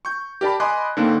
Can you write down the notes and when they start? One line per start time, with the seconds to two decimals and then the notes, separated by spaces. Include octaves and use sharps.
0.05 C#6 G6
0.41 G4 A#4 D5 A5 B5
0.60 D#5 G#5 B5 C6 D6 F#6
0.97 D3 D#3 A#3 C4